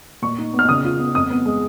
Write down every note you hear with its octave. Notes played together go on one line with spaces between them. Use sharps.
A#2 C#6
D#4
B3
F6
C#3 D#6
F4
B3
F2 D#6
B3
G#3